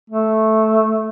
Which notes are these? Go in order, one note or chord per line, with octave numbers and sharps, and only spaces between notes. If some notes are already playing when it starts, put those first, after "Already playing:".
A3